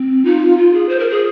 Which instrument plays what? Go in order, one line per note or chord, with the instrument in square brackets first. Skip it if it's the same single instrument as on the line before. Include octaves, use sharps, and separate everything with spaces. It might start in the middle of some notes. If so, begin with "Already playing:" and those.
Already playing: [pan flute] C4
[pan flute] D#4 [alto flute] F4
[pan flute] F4
G#4
C5
A#4
G#4